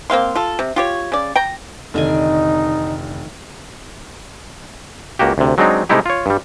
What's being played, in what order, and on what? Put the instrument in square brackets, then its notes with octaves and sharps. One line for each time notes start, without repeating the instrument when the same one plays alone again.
[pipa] A#3 C4 F5 C6
F4 A4
C3
F4 G4 C#5
C#3 D5
G5 A#5
[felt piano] F1 [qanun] D3 D#3 G#5 [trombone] D#4
[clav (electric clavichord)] C#2 A#3 F#4 G4
D2 C3
F#3 G#3 C4 D4 D#4
C3 G#3 A3 D#4 E4 G4
F4 C#5
G2 G3